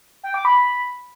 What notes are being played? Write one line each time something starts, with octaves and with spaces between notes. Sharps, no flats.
G5
D6
B5